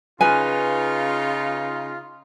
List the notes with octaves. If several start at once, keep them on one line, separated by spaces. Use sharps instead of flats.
C#3 D#4 F4 B4 G#5